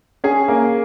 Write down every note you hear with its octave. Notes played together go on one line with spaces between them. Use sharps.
C#4 G#4
A#3